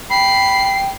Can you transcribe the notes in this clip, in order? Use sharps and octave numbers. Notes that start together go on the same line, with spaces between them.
G5 B5 C7